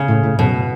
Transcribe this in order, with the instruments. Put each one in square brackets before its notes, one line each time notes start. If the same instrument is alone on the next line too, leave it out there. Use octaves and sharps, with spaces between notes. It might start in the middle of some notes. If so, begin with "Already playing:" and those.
Already playing: [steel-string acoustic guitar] C#3
[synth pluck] A2
A2
[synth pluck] F#2 [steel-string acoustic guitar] B2